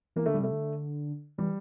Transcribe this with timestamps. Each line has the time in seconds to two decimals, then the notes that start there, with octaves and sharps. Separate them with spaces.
0.16 E3 A#3
0.26 D3 A3
0.34 G3
0.40 C3 A3
0.52 D3
1.38 E3 G3